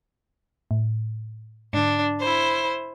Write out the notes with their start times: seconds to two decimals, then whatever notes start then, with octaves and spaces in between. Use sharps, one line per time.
0.71 A2
1.73 G#2 D3 D4
2.20 E4 C5